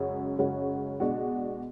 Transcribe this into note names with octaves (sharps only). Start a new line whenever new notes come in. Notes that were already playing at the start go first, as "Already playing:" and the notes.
Already playing: F#2 C#3 G#3 C#4 F#4
F#2 C#3 G#3 C#4 F#4
B2 G#3 D4 F#4